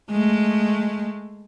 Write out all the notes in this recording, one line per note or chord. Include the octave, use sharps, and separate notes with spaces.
G#3 A3